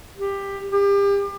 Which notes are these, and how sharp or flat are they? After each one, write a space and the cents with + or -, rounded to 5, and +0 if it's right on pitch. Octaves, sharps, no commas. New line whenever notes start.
G4 +15
G4 +35